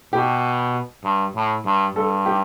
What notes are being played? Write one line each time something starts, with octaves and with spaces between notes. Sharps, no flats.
B2 G4
G2
A2
G2
G2 A4
G4